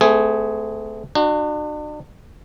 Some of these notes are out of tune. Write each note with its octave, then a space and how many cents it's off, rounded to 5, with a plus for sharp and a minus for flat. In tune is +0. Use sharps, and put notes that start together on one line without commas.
A3 -15 C4 -45 G#4 +0
D4 +40 F#4 +0